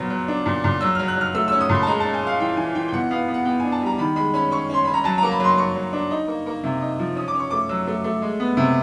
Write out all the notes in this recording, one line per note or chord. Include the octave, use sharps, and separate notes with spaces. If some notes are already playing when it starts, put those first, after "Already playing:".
Already playing: A#2 F#3 B3 F6
F#3
D4
A#2
A#2
F#3 E6
F#3 F6
F#6
F#3 F6
A3 E6
C#4 E6
D#6
A#2 B5
A5
G#3 A#5
C#4 A5
G#5
G#3 F5
E3 G5
E3 G#5
E3 G5
G5
B2 F#5
B3 F5
B3
F#5
B3 G5
D4 G#5
A5
G3 A#5
D#3 B5
G#3 B5
C#4 B5
C#4 C#6
C#4 C6
C#4 B5
A#5
F#3 A5
A#3 A#5
B5
F#3 C6
A#3 C#6
F#3
D4
D#4
A#3
A#3
C3
D#4
F3
C#4 D#6
D6
C#4
C#6
A3 D6
F#3 E6
A3
A3
G#3
B3
C3